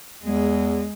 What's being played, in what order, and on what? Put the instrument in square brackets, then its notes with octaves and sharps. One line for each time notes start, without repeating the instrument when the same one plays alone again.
[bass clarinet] E2 [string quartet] G#3